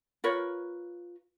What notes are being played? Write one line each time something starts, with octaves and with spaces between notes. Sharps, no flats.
F4 A#4 B4 C#5